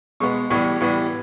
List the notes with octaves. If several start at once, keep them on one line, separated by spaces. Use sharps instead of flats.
B2 G#3 B3 C#6
A2 E3 G3 B3 C#6
A2 E3 G3 B3